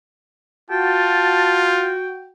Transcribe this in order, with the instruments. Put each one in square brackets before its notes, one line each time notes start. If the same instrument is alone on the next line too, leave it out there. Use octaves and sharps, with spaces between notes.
[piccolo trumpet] F4 [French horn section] F#4 [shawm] G5 [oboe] A5